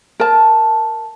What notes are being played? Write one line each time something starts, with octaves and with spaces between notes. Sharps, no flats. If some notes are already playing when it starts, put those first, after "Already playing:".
A#4 A5